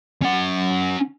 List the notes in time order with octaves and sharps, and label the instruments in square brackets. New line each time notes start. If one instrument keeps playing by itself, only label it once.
[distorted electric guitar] C#4 F#5